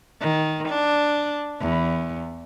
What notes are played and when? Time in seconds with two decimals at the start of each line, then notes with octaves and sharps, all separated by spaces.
0.21 D#3
0.69 D4
1.60 E2